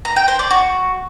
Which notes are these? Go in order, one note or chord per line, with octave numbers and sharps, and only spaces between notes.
A#5
G5
C5
D5
F#4